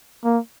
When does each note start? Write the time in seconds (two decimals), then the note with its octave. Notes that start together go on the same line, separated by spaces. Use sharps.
0.24 A#3